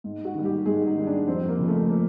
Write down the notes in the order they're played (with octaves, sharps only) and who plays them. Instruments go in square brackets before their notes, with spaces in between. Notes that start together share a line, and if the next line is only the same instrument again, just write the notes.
[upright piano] G#2
F#4
D#3 G3
G4
G#2 G#4
D#4
D#3 G3
D4
F2 C4
A#3
C#3 F3
A3
A#3